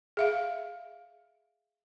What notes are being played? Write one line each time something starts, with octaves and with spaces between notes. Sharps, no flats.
G#4 E5 F5